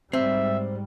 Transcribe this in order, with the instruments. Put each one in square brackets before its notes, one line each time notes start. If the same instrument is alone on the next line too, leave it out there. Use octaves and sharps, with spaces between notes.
[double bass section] G#2 G3 [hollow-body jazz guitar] C4 [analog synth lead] E5